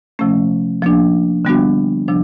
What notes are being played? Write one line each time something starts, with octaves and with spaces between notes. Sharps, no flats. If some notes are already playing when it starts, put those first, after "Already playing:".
C3 F3 A3 C#4
F3 A#3 D4
D3 G3 B3 D4 F#4
C3 F3 D4